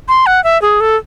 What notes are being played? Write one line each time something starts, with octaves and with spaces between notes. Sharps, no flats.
C6
F#5
E5
G#4
A4